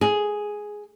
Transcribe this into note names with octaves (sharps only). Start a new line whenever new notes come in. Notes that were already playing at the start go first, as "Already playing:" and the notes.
G#4